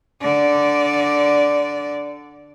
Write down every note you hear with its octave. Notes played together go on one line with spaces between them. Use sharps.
D3 D5